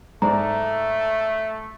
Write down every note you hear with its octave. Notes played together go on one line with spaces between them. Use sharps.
G#2 A3 D5 A#5